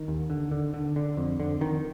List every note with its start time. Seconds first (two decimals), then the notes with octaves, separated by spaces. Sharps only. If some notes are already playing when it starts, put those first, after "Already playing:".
Already playing: D#3
0.08 D#2
0.30 D3
0.52 D3
0.74 D3
0.96 D3
1.17 F2
1.39 F2 D3
1.61 F2 D#3